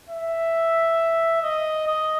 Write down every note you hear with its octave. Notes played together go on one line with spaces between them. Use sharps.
E5
D#5
D#5